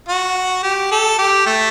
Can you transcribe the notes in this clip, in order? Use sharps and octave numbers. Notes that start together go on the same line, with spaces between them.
F#4
G4
A4
G4
A3